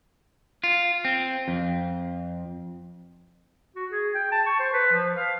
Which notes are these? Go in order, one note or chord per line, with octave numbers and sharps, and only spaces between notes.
F4
C4
F2
F#4
G#4
G5
A5
C#6
C5
B4
F3
F5